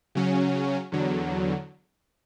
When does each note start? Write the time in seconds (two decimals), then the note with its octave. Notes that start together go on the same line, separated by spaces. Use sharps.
0.15 C#3 F#3 C#4
0.92 E2 D3 F#3